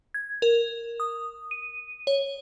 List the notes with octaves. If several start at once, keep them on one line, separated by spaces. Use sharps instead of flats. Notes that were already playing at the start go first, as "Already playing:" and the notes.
G#6
A#4
D#6
D#7
C#5